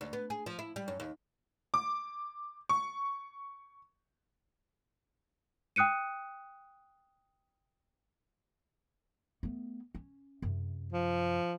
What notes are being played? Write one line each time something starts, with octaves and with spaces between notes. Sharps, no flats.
D2
B3
G#4
F3
E4
G3
F#2
D#2
D6
C#6
G5 D#6 F#6 C#7 D#7
A3 B3
C#4
F#2 C3
F3